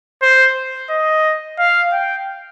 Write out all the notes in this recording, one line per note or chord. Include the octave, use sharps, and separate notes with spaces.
C5
D#5
F5
G5